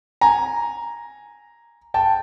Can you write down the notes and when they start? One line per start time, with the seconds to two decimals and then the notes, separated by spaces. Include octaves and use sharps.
0.21 G#5 A#5
1.94 G5 A5